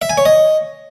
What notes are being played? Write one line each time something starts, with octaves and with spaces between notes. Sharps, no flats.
E5
G#5
C#5
D#5